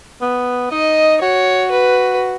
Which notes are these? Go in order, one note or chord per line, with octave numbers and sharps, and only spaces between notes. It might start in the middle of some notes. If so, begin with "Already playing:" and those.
B3
D#4 D#5
F#4 C#5
B4